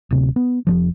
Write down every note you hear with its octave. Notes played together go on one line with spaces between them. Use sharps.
D1 C3
B3
F1 C2 F3